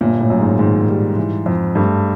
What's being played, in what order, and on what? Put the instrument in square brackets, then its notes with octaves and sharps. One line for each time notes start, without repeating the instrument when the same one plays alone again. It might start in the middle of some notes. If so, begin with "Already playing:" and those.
[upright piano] G1 [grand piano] A#2
[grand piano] A2
[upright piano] F#2
[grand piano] G#2
[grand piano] G#2 [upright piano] D#3
[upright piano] G3
E3
F2
[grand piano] G2 [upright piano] A3